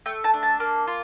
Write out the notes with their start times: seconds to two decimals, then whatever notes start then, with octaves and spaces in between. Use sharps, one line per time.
0.06 A3 G5
0.24 A5
0.34 D4
0.43 A5
0.60 A#3
0.87 F4